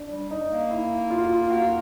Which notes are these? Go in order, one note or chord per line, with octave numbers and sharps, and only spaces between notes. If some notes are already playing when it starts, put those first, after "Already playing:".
Already playing: D4
G3
D#4
A#3
E4
F4
F#4
F4
A#3 F#4
F4